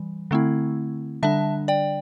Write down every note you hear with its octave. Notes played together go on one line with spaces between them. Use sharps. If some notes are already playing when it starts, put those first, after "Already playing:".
Already playing: E3 G3
D3 A3 C4 E4
D3 G3 D4 E5 A5
D5 G5